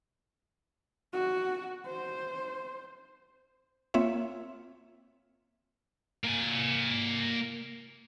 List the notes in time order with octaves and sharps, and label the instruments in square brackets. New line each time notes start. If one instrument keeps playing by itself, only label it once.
[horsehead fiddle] F#4
C5
[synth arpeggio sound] A#3 C4 F4 C#5 E5
[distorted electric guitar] A#3 G#5